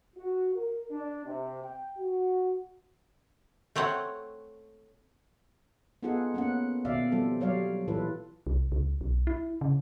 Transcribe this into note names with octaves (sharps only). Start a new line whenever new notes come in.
F#4
A#4
D4
C3
G5
F#4
A3 C4 C#5 F#5
B3 D#4 F4 G#4 A4 F#5
A#3 B3 C#4 F#5
B2 D#3 B3 D5 E5 F5
F3 G3 C4 A4
F#3 G3 C#5 D5 F5
A#2 E3 F4 A4 B4
C2
C#2
B1
E4
C#3